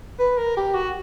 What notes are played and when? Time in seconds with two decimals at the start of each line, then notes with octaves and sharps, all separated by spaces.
0.19 B4
0.38 A#4
0.57 G4
0.75 F#4